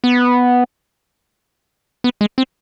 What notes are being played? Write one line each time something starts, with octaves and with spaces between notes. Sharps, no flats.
B3
B3
G#3
C4